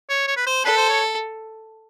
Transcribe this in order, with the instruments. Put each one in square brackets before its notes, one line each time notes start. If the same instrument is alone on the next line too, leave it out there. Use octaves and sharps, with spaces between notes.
[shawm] C#5
C#5
B4
C5
[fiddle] A4 [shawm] B4
[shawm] C5
C#5